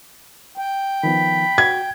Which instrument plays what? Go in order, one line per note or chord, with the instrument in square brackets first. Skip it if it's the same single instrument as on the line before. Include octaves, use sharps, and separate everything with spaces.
[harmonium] G5
[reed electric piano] D#3 F3 B3 [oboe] B5
[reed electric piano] F#4 [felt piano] G#6